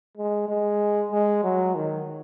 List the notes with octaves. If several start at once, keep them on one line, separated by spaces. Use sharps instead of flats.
G#3
G#3
G#3
F#3
D#3